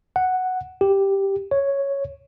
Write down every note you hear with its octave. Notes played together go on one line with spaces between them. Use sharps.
F#5
G4
C#5